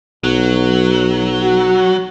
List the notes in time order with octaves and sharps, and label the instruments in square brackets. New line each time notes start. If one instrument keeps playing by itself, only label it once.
[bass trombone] B1 [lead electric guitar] F#3
[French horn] F#4